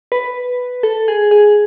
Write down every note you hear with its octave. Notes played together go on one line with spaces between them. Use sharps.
B4
A4
G#4
G#4